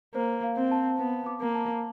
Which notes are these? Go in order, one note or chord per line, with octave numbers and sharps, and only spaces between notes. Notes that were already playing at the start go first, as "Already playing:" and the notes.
A#3 C5
F5
C4
A5
B3 A5
D6
A#3
A5